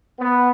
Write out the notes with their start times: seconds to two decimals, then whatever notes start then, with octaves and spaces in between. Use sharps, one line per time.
0.18 B3